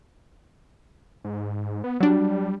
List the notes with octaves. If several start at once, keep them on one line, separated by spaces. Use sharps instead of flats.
G#2
B3
F#3 G3 D4